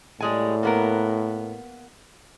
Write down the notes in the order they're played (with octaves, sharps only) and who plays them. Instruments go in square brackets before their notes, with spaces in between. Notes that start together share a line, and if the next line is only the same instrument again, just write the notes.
[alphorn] A2 [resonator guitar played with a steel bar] G3 G#3 G#5
[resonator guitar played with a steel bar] A#3 B3 A#4